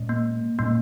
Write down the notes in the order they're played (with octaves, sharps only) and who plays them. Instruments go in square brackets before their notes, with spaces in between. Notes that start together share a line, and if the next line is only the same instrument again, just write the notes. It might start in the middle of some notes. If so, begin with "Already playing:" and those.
Already playing: [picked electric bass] A#2 G#3 C#4
[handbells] A#3
[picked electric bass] A#2 G#3 C#4 [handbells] A#3